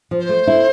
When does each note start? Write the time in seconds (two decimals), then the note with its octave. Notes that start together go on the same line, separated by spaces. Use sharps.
0.11 F3
0.20 C5
0.29 A3
0.47 E4